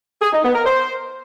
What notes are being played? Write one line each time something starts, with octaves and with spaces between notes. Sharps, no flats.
G#4
D#4
B3
A#4
C5